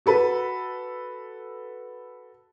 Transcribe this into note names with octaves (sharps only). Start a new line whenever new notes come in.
F#4 A4 B4